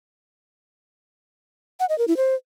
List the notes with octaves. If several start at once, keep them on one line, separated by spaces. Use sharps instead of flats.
F#5
D#5
A#4
E4
C5